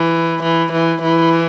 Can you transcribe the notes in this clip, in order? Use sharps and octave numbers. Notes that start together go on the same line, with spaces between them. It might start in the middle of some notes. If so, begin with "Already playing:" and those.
Already playing: E3
E3
E3
E3